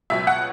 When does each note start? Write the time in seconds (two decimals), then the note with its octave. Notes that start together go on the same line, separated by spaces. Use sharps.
0.10 C#2 B2 F#3 E5
0.27 F#5